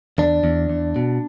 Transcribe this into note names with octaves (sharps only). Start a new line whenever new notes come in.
E2 D4
E2
E2
B2